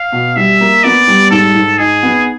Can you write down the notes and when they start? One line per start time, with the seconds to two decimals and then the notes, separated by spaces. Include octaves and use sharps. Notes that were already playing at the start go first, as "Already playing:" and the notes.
Already playing: F5
0.12 B2
0.36 G3 E5
0.61 A#3
0.84 B3 D5
1.08 G3
1.31 G#2 A4
1.55 G#2
1.79 D#4 G#4
2.03 B3